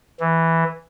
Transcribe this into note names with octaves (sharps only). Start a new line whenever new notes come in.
E3